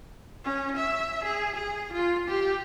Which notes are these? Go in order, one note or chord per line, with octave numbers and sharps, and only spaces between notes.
C#4
E5
G#4
G#4
F4
G4